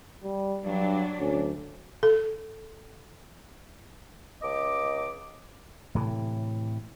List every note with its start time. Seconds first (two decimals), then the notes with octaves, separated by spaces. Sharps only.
0.23 G3
0.65 G2 F#3 D4
1.20 D2 C#4
2.03 A4
4.42 C#2 D#5 D6
5.95 A2 C3 E3